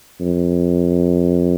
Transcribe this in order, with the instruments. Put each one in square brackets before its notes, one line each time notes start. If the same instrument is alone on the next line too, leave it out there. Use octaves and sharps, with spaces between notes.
[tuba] F2